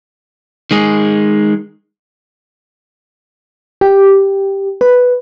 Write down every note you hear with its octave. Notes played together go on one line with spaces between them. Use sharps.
D#3 G#3 G#4
G4
B4